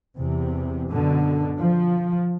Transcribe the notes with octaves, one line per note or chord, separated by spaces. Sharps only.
E2 C3
F#2 B2 D3
F3